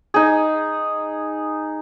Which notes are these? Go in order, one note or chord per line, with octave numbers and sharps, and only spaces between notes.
D#4 G#4